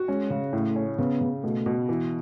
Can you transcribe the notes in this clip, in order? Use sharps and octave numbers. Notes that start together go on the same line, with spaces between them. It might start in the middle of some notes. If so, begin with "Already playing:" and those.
Already playing: F#4
G#3 C#4
C#3
A2 A3
C#4
C#3 B3
C#3
B2 A3
B2
E3